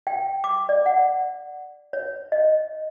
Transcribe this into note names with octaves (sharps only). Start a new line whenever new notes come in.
G5
D6
D5
F#5
C#5
D#5